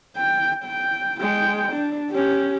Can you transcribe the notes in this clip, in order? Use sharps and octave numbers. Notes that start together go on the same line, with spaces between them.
G5
G5
G#3 G5
D4
C#4 G4